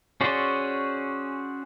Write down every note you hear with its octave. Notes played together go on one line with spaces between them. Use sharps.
C#4 F#4 G#4 C5 D5